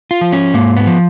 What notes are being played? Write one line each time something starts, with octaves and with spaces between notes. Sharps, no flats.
F4
F3
C#4
G#2 A#3
B3
F3